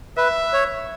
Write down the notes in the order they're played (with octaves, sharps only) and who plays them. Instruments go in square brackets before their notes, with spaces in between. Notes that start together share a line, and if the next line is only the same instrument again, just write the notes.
[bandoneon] B4 [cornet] E5
[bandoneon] C#5